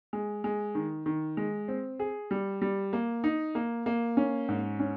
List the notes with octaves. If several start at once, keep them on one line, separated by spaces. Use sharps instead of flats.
G#3
G#3
D#3
D#3
G#3
C4
G#4
G3
G3
A#3
D#4
A#3
A#3
C#4
G#2
C#4